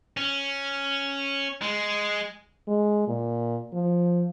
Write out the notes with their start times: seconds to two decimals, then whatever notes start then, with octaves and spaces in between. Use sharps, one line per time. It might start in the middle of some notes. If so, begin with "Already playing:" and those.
0.17 C#4
1.62 G#3
2.67 G#3
3.07 A#2
3.73 F3